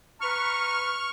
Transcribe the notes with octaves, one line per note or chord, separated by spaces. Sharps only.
B4 A#5 C#6 F6